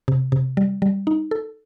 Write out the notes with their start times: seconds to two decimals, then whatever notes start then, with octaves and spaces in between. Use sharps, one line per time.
0.08 C3
0.32 C3
0.57 G3
0.82 G3
1.07 D#4
1.31 A4